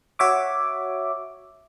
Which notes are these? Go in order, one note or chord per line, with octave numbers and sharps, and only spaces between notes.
F#4 C#5 E5 D6